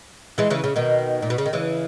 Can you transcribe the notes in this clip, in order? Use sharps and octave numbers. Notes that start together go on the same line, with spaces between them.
E3 G#3
C#3 E3
C#3
B2 D#3
A#2
B2
C#3
D#3
C#3 E3